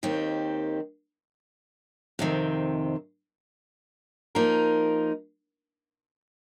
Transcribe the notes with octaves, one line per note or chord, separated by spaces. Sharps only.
D#2 D#3 C4 G4
F2 C3 D#3 C4
F3 A#3 D#4 A#4